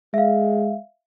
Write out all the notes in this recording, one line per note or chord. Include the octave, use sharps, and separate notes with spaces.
G#3 E5 F5